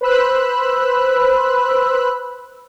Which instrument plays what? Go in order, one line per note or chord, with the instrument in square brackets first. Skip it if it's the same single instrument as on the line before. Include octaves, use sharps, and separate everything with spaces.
[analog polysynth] B4 C5 B5 E6 F#6